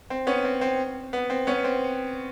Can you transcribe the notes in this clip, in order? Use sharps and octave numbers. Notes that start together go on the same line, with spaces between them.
C4
B3 C#4
C4
C4
B3
C4
B3 C#4
C4